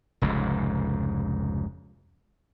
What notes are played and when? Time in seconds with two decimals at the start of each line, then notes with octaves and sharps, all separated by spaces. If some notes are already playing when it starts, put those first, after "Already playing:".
0.22 F1 C#2 G#2